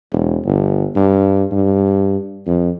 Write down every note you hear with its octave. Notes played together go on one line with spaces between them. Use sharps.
E1
G1
G2
G2
F2